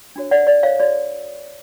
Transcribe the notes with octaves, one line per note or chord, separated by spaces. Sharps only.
D4 F#4 C#5
D5 F#5
D5
C#5 F5
F#4 A4 C#5 D5